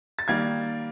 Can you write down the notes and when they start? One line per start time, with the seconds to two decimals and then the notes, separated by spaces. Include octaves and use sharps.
0.19 A6
0.28 D#3 G3 A#3 G#6